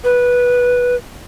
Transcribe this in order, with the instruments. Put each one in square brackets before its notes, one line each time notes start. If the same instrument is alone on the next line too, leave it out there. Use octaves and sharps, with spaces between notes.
[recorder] B4